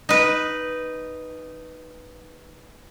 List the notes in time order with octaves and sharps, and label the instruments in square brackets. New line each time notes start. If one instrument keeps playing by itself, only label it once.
[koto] D#4 B4